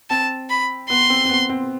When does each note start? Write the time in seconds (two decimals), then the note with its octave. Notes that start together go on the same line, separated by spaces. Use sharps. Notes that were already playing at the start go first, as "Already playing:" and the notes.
0.10 C4 A5
0.50 B5
0.90 B3 C6
1.10 C4
1.25 C4
1.29 B3
1.49 C4